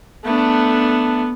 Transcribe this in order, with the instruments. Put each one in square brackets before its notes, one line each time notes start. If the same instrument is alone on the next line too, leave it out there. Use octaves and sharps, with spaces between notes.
[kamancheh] A3 D4 [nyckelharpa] B3